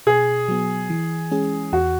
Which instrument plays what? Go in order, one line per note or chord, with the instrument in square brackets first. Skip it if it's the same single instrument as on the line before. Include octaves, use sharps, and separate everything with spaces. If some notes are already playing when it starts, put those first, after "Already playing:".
[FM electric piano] B2 [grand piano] G#4
[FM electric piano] F#3 B3
E3
G#3 C#4 G#4
[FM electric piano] E2 [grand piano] F#4